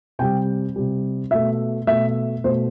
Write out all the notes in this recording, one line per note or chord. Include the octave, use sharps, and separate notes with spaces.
C3 G3 G5
C3 G3
B2 A3 E5
B2 A3 E5
B2 A3 C5